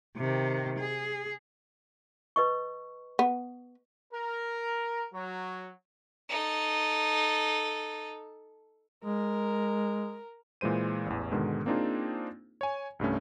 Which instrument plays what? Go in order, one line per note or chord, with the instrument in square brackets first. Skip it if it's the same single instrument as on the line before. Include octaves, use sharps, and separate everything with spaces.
[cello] C3 D#3
G#4
[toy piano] B4 D#5 C#6
[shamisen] B3
[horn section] A#4
F#3
[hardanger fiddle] D#4 A4
[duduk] G#3 [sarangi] A#4
[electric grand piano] A#2 E3 G#3 C5 D#7
A1 E2
G#2 B2 D3 D#3 G#3
A#3 C4 D4 D#4 F4 G#4
C#5 G#5
C2 G2 A3 C#4